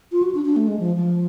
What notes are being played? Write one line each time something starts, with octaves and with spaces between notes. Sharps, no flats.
F4
F#4
D4
D4
A3
G#3
F3
F3